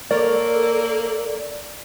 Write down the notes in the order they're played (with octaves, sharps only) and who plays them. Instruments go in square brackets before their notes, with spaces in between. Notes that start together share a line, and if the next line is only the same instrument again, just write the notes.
[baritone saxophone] A#3 [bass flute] A4 [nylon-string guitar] A#4 C#5 [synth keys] D5